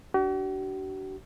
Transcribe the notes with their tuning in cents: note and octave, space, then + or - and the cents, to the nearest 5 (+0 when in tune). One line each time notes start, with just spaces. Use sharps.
D4 -5 F#4 +45